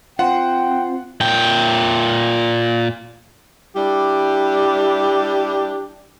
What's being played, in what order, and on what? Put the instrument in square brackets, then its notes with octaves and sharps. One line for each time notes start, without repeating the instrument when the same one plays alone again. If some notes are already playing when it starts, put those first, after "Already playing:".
[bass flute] C4 [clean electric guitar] F4 C5 [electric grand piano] F#5 [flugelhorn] G5
[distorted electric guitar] A#2 G5
[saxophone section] G3 D4 E4 G4